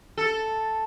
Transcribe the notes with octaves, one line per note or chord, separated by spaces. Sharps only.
A4